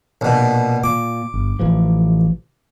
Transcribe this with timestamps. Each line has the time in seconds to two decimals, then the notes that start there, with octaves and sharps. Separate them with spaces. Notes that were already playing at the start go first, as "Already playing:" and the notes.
0.21 A#1 B2
0.84 A#2 D6
1.34 G1
1.59 A1 E3 F3